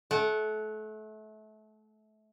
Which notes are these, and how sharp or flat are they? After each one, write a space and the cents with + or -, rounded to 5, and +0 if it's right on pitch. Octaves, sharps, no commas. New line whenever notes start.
A3 -30 F#5 +0